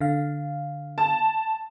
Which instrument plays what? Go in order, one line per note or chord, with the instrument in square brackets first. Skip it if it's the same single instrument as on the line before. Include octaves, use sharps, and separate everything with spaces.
[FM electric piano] D3 F5
[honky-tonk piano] A5